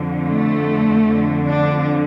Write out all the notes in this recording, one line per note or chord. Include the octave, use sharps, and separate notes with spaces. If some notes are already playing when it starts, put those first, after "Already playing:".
Already playing: F2 D3
A3
F2 D3
D4